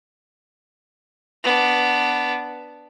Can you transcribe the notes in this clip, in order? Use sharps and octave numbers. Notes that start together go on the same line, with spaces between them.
B3 D4